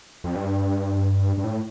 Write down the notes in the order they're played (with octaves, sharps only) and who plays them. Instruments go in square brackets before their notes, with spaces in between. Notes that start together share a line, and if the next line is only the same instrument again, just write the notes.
[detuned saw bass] F2
G2
G2
A2